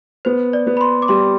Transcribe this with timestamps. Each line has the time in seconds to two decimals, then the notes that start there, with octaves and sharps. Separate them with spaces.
0.25 B3 C5
0.53 D5
0.67 B3
0.77 B5
0.81 C6
1.02 D6
1.08 G3 C6